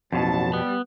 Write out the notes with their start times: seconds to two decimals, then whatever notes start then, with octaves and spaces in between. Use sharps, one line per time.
0.13 A1 F2 B2 F#3 A5
0.53 G3 B3